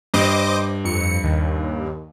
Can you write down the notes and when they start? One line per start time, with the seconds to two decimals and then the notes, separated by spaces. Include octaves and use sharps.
0.14 G2 C5 D#5 D6
0.84 F2 C#7
1.24 D#2